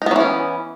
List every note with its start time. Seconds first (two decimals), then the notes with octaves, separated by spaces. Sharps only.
0.02 D#4
0.06 B3
0.11 F#3
0.16 E3
0.21 C#4